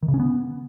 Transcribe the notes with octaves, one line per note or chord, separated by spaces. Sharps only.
D#3
C#3
C#4
B3